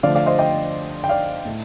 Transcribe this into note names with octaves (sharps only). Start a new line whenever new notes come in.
D3 F3 A3 D5 F5
D5 F5
C5 D#5
D#5 G5
G5
D5 F5
A2 A3